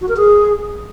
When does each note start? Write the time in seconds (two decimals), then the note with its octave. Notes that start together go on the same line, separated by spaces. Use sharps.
0.01 F#4
0.09 A#4
0.16 G#4